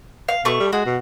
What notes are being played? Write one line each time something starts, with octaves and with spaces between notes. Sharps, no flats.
F5
B2 A3 C#6
G3
G#3 F#4
B2